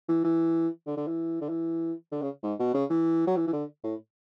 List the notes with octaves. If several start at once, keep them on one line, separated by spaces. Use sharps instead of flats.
E3
E3
D3
D3
E3
D3
E3
D3
C#3
G#2
B2
C#3
E3
F#3
E3
E3
D3
A2